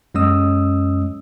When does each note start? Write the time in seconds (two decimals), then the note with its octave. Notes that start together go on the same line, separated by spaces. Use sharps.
0.15 F#2 G#3 C#4 D#5 D#6 E6